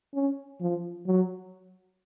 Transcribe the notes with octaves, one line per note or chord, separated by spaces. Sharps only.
C#4
F3
F#3